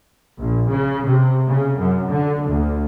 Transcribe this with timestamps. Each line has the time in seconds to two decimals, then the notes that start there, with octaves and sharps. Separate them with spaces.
0.40 A#1
0.70 C#3
1.07 C3
1.47 C#3
1.79 F#2
2.09 D3
2.48 D2